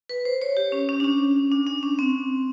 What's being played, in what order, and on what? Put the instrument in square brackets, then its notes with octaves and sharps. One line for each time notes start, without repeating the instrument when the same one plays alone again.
[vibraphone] B4
C5
C#5
G4
C#4
C#4
D4
C#4
D4
D4
C#4
C4